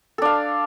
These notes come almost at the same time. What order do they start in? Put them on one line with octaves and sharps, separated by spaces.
A4 D4 F5